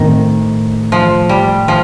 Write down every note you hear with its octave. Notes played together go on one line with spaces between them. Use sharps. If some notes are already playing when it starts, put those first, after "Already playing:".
Already playing: A2 D#3 A3 C4
F3
G3
F3